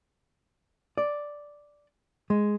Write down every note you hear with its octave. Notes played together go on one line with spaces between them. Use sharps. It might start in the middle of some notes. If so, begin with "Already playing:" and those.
D5
G#3